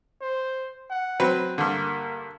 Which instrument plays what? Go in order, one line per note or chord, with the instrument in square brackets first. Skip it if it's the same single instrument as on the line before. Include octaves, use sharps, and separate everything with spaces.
[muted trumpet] C5
F#5
[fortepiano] F#3 C4 B4
[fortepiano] G2 D3 [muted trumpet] A#3